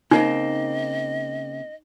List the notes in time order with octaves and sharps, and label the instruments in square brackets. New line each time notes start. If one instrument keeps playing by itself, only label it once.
[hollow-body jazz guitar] C#3 A#3 C4 [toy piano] D#4 [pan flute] D#5